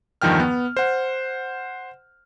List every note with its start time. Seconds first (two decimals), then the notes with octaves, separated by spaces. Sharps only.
0.22 E2 G2 D#3 F3 G5 F6
0.40 B3
0.77 C5 F#5